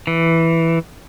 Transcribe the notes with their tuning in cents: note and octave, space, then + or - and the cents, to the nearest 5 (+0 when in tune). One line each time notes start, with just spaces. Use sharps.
E3 +0